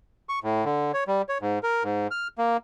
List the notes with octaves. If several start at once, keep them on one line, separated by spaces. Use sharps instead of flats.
C#6
A2
D3
C#5
G3
C#5
G#2
A#4
G#2
F6
A#3